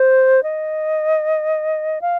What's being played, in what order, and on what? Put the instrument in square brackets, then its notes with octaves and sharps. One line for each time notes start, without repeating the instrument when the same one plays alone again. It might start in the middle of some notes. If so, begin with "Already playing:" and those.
Already playing: [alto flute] C5
D#5
F5